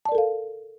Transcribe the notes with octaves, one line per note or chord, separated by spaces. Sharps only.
A4 A#4 D5 F5 A5